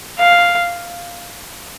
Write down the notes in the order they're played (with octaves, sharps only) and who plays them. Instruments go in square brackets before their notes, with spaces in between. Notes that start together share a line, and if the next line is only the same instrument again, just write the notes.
[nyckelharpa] F5